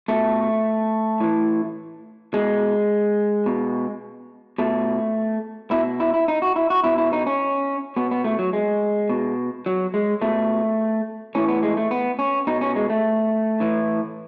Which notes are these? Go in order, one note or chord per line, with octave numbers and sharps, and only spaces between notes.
B2 A3
A2 E3
B2 G#3
B2
B2 A3
B2 E4
E4
E4
D#4
F#4
E4
F#4
B2 E4
E4
D#4
C#4
B2 B3
B3
A3
F#3
G#3
B2
F#3
G#3
B2 A3
A2 E3 C#4
B3
G#3
A3
B3
C#4
B2 D#4
C#4
G#3
A3
A2 E3